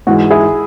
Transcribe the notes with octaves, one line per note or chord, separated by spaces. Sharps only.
G#2 E3 G#3 F#4
E4 G#4